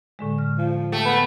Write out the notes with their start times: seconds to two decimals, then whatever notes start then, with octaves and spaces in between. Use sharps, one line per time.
0.19 A2 D3 G#3
0.38 F6
0.58 F3
0.92 A3 G5
1.05 B3 B5